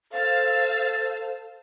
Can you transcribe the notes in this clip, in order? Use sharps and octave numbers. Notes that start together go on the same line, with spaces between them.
A4 C5 F5 E6 A6